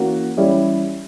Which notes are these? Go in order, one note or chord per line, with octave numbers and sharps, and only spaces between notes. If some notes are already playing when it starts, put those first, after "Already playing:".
Already playing: E3 A#3 C#4 F#4 A#4
E3 G3 C#4 E4 G4